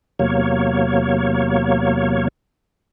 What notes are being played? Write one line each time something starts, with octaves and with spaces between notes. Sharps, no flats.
E2 C3 F#3 A#3 C#5